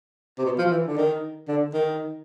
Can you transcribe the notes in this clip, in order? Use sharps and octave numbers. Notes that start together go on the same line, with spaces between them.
C3
B2
F3
E3
D3
D#3
D3
D#3